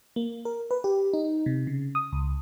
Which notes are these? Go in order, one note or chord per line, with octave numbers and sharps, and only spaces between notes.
A#3
A#4
B4
G4
D#4
C3
C#3
D#6
C#2